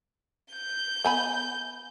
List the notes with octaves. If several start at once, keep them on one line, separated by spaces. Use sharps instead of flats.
G6
B3 G#5 B5